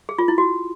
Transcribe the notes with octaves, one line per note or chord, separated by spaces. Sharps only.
G#4
F4
E4
F#4